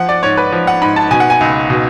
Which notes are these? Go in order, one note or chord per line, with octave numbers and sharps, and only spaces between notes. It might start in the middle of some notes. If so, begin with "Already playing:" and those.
Already playing: F3 F#5
D5
G#2 C#5
B4
F3
F#5
G#2 B5
A5
B2 G#5
F#5
G#5
C#2
B2